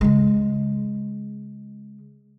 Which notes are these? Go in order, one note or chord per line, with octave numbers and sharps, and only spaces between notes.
C#3 G#3